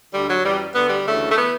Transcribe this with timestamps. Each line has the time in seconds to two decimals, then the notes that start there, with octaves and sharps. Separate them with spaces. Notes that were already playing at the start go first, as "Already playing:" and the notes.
0.13 D2 D3 G3
0.29 F#3
0.44 F#2 E3 G3
0.75 D2 D3 B3
0.90 G3
1.06 D2 C#3 E3 A3
1.32 A3
1.36 E3 B3